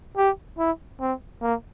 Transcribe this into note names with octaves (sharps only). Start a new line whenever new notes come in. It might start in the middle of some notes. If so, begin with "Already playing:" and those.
G4
E4
C4
A#3